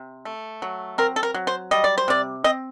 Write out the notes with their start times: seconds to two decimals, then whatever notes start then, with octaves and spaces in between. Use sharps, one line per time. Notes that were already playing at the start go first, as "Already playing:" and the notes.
Already playing: C3
0.25 A3
0.62 F#3
0.98 C4 A#4
1.16 A4
1.23 A#4
1.34 F#3
1.47 C5
1.71 G3 D#5
1.84 D5
1.98 C5
2.08 C3 D5
2.44 C4 D#5